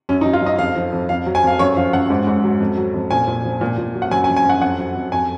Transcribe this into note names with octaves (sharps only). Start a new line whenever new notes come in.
F#2 C#4
D#4
F#3
F4
F#2 D#5
F2 F5
F3
F2
F2 F5
F#3
G#5
F2 F5
F#2 C#5
F3 F5
F#2 F#5
G#2
G#2
F#3
F2
F#3
F2
A#2 G#5
A#2
F3
A#2
A#2
F#3
F#5
F#2 G#5
G#5
F3
G#5
F#2 F#5
F2 F#5
F#3
F2
F2 G#5